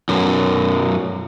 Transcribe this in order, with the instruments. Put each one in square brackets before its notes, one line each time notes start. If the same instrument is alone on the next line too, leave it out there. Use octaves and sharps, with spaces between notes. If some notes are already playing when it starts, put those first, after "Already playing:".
[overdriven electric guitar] B1 F#2